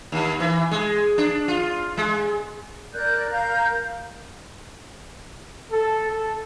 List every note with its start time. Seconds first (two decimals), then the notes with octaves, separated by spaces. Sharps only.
0.12 D#2
0.40 E3
0.71 G#3
1.18 D4
1.48 F4
1.97 G#3
2.93 A#4 D5 F#6 G6
3.32 A#4 F5 A#5 G6
5.72 A4
6.10 A4